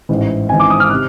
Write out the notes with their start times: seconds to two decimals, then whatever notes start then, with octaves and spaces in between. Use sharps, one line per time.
0.09 A1 G#2 E3
0.49 G#1 G#2 E3 G#5
0.60 D6
0.70 D#6
0.80 F6
0.90 C3 F#6